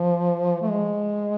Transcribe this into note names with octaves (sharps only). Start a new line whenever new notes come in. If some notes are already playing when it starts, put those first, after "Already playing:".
Already playing: F3
A3
G#3